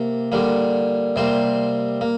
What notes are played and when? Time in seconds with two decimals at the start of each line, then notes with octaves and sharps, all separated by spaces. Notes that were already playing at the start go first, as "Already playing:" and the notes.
Already playing: C3 A#3
0.32 D3 G3 A#3
1.16 C3 G3 A#3 C5
2.01 A#3